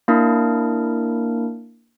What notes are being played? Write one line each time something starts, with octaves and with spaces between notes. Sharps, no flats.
A#3 D4 E4 A#4